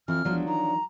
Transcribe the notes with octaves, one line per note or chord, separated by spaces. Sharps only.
F2 E3 F6
E1 F3 F#3 D4
D#3 A#5